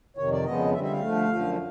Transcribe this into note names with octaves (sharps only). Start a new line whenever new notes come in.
F2 C3 D#3 C#5
D5
F2 C#3 F3 G#3 B3 D#5
D3 G3 C4 E5
E5
F5
D3 F3 A3
F#2 D3 F3